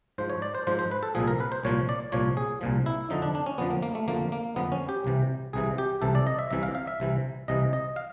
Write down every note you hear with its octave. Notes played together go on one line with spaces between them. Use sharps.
G#2 F3 C5
C#5
D5
C5
G#2 F3 C5
C5
B4
A4
C2 A#2 F3 G#4
A#4
B4
C5
C2 A#2 F3 C#5
D5
C2 A#2 F3 C#5
G#4
C2 A#2 F3
E4
F2 D3 F3 D#4
D4
D4
C#4
F2 D3 F3 B3
A#3
A#3
A3
F2 D3 F3 A#3
A#3
F2 D3 F3 B3
C#4
G4
C2 C3 E3
C2 C3 E3 G#4
G4
C2 C3 E3 A4
D5
D#5
E5
C2 C3 E3 E5
F5
F5
E5
C2 C3 E3
C2 C3 E3 D#5
D#5
F5